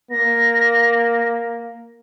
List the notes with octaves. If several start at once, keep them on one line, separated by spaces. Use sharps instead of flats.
A#3 A#6